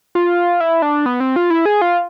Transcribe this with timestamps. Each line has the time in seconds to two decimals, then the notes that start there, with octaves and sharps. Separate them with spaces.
0.15 F4
0.60 E4
0.82 D4
1.06 B3
1.20 C4
1.36 F4
1.50 E4
1.66 G#4
1.81 F4